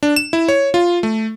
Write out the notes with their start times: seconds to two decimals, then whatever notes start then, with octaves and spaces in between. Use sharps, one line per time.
0.03 D4
0.16 E7
0.33 E4
0.48 C#5
0.74 F4
1.03 A3